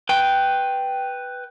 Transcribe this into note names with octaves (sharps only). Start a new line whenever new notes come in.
B4 G5